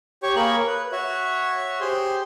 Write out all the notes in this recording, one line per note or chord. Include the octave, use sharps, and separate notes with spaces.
G4 C#5 C#6
A#3 G#4 A#4 C#5 B5 C#6
B4
F#4 C#5 E5
G4 G#4 C5 C6